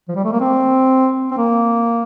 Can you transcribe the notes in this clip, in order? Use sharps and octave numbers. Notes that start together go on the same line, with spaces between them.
F3
G3
A3
A#3
C4
C4
A#3